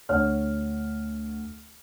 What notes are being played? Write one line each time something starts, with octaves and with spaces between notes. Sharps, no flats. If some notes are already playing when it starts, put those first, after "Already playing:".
D2 C#5 F#5 F6